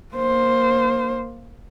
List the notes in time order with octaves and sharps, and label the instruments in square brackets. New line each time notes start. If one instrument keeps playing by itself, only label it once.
[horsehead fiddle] A#3 C5